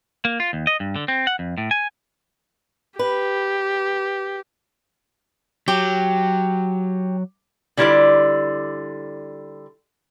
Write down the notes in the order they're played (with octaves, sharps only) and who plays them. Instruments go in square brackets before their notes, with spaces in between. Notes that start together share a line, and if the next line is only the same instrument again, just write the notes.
[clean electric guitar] A#3
F4
D#2
D#5
G2
D3
C4
F#5
F2
A2
G#5
[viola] G4 [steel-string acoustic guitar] B4
[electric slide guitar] F#3 [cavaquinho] G4
[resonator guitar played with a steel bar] D3 G3 E4 F4 B4 D5